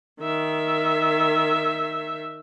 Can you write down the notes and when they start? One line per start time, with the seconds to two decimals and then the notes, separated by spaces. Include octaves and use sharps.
0.20 D#3 E5